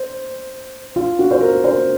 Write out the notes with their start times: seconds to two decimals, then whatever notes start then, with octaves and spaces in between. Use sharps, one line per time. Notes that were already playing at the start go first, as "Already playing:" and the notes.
Already playing: C5
0.96 F4
1.19 F#4
1.31 C5
1.41 A#4
1.64 C5